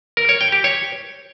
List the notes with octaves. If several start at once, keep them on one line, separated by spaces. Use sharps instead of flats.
A#4
C#5
G5
G4
C#5